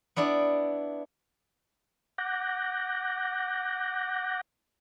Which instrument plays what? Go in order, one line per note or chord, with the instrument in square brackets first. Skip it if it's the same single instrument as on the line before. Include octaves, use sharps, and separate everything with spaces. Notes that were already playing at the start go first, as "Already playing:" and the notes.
[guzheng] B3 D4 E4 D5
[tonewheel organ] F#5 D6 F#6 G6 A#6